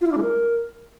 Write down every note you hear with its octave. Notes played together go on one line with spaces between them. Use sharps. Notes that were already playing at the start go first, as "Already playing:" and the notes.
F4
E4
D4
G#3
A#4